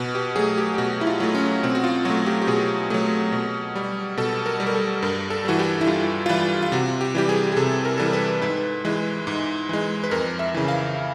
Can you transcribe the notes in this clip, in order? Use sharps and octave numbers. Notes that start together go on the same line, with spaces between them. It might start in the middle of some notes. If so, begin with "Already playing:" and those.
Already playing: B2 B4
G4
F#3 A3 G#4
G4
G4
B2 F#4
E4
F4
F#3 A3
C#4
B2 C4
F#4
F4
F#3 A3 F#4
G4
G4
B2 G#4
F#3 A3
B2
G3
B2 A4
A#4
G3
A#4
A4
G2 A#4
A4
E3 G3 F#4
G4
E4
G2 F4
F4
E3 G3 E4
F4
C3 F#4
G4
E3 G3 G4
G#4
G#4
C3 A4
A#4
E3 G3 A4
A#4
B4
G#2 B4
E3 G#3
G#2
E3 G#3
B4
F2 A#4
E5
C#3 E3
F5